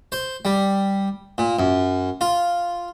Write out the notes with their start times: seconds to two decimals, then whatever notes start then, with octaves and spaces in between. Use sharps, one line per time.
0.12 C5
0.45 G3
1.38 A#2
1.59 F#2
2.21 F4